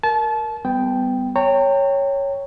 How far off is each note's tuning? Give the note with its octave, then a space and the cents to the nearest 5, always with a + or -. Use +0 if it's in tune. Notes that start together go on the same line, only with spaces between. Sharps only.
A#4 +0 A5 -30
G3 +0 B3 +30 G5 +0
C#5 +0 G5 +10 A#5 -40